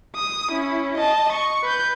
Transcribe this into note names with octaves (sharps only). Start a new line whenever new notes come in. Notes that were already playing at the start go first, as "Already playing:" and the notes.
D#6
C#4 E4
D#5 A5
C#6
B4 G6